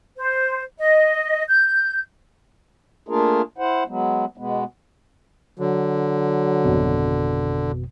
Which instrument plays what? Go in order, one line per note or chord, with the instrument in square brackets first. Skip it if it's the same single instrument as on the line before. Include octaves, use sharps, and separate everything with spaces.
[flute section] C5
D#5
G6
[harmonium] A3 A#3 D4 F4 G#4 A#4
E4 C5 F#5
F#3 G#3 B3
B2 G#3 B3
[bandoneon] D3 [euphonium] F#3
[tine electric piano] G#1 F2 B2